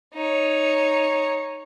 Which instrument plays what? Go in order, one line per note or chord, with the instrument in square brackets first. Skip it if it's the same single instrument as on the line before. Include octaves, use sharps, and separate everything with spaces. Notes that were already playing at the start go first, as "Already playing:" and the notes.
[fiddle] D#4 C#5